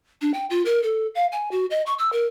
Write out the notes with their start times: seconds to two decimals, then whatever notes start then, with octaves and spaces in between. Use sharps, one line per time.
0.22 D4
0.34 G5
0.50 F4
0.65 A#4
0.83 A4
1.15 F5
1.32 G#5
1.51 F#4
1.71 D#5
1.86 C#6
1.99 E6
2.13 A#4